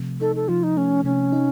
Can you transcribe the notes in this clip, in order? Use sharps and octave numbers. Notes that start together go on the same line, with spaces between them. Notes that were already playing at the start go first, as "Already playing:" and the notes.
Already playing: C3 F3 A3
D#4 A4
A4
F3 F4
D#4
A3 C#4
C3 C#4
D#4